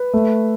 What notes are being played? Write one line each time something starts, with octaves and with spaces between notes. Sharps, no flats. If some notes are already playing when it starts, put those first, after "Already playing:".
Already playing: B4
A3